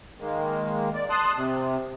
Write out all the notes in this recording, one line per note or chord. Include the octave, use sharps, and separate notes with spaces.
D#3 G#3 A#3
D5
A5 C6 D#6 F#6
C3